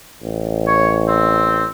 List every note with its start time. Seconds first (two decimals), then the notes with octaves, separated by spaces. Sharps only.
0.23 A1
0.67 C#5
1.08 C4